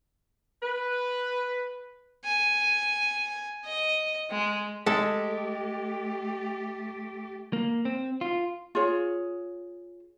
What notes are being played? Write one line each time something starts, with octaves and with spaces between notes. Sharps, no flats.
B4
G#5
D#5
G#3
G#3 A3 G4 A4
A#3
C4
F4
F4 G#4 C#5